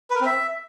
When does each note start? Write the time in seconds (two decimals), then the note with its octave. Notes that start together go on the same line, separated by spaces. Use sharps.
0.10 B4
0.16 A#4
0.21 C4
0.26 E5